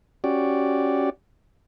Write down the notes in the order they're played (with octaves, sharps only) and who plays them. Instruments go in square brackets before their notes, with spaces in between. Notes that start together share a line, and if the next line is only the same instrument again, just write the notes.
[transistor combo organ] C#4 F#4 G4 D5